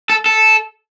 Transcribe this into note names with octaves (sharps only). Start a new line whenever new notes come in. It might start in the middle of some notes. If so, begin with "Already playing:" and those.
A4
A4